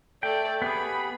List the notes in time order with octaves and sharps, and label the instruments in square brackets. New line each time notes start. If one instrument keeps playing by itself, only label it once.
[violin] A3 D5 [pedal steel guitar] G5
[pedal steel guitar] B3 G4 G#4 [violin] B5